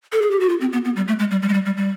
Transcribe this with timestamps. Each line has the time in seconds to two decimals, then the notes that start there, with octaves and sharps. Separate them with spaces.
0.13 A4
0.22 G#4
0.31 G4
0.40 F#4
0.49 F4
0.61 C4
0.73 B3
0.85 B3
0.96 G3
1.08 A3
1.19 G#3
1.31 G3
1.42 G3
1.49 G#3
1.54 G3
1.66 G3
1.77 G3